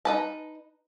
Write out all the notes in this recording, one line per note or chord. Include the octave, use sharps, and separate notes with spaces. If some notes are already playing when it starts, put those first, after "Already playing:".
D#4 B4 A5